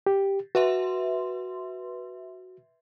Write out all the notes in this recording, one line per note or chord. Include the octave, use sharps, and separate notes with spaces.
G4
F#4 B4 E5 C6